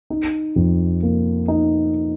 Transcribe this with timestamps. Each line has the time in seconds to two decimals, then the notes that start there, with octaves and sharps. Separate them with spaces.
0.10 D#4
0.56 F2
1.03 A#3
1.48 D#4